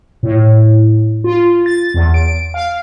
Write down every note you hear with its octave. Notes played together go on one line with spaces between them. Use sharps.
A2
F4
A6
E2
D7
F5